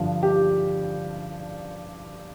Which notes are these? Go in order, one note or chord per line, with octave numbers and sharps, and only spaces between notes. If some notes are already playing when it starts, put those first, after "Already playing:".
Already playing: G2 D3 F3
G4